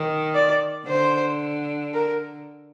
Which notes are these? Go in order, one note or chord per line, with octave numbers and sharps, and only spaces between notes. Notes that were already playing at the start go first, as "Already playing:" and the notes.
Already playing: D#3
D5
D3 C5
A#4